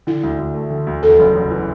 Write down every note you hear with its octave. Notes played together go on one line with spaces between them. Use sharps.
D3 E4
D2
D2
A3
D3
D2
E2 A4
F#1
F#1
E3